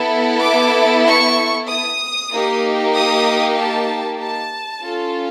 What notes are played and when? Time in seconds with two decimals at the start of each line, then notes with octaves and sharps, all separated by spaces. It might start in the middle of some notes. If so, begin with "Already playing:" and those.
Already playing: B3 E4 A4
0.43 D6
1.06 C#6
1.69 D#6
2.32 A#3 D#4 G4
2.95 D#6
3.58 A5
4.21 A5
4.84 C#4 F4 A4